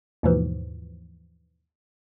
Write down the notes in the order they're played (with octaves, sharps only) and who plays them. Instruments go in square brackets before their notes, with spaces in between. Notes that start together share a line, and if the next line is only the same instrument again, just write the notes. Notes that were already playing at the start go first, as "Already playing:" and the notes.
[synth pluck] D#2 G#2 B2 E3 F3